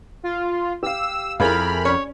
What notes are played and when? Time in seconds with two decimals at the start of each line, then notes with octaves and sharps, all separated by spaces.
0.23 F4
0.83 G4 F5 E6
1.40 F2 E4 G#4 A#4 F5 B5 F6
1.85 C#4 C#5